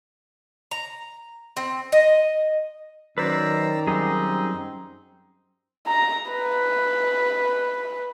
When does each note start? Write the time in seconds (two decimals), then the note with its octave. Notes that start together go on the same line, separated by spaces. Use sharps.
0.71 A#5
1.57 C4
1.92 D#5
3.18 F#2 D#3 B4 C5 D5 A#5 E6
3.87 F#2 G3 C4 D#4 G#4
5.87 A#5
6.31 B4